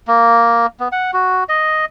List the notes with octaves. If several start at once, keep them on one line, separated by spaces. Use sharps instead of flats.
A#3
B3
F#5
F#4
D#5